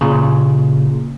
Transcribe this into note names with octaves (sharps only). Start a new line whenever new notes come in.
A#2 C#3